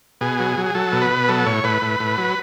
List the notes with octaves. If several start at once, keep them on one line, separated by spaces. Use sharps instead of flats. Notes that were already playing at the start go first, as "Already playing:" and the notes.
B2 G#4
F#3
F#3
G#4
F#3 A4
B2
B4
B2
F#3 A4
A2 C#5
A2 B4
A2
A2
F#3